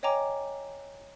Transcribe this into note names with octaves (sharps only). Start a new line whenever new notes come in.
C#5 D#5 G5 G#5 A#5 D6